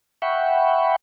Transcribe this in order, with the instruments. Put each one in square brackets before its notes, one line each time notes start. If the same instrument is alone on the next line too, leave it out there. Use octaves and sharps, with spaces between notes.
[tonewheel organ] E5 F#5 G5 B5 C#6